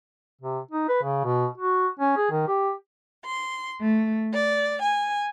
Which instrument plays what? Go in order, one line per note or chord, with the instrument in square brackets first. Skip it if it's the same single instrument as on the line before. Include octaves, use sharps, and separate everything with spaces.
[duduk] C3
D#4
B4
C#3
B2
F#4
C#4
G#4
D#3
G4
[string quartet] C6
A3
D5
G#5